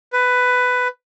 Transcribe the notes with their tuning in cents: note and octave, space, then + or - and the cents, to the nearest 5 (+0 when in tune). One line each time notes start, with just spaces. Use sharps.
B4 +10